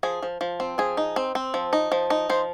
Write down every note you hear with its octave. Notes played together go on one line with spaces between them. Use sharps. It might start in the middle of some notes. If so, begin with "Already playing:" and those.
F3 G#4
F3
F3
C4
F3 G#4
D#4
C4
C4
F3
D#4
F3
D#4
F3 C5